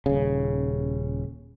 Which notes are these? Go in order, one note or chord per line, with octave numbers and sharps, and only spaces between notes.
D#1 C#3